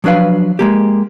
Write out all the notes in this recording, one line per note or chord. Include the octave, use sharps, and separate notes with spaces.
F3 F#3 D4 B4 F5
G#3 A#3 G4